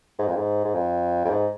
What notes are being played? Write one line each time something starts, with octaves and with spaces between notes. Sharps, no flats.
G#2
F2
G#2
G#2
F2
F2
G#2